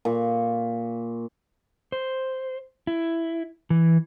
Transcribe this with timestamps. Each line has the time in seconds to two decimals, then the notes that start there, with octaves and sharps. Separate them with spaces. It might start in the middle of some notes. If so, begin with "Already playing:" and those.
0.05 A#2 C#6
1.92 C5
2.87 E4
3.70 E3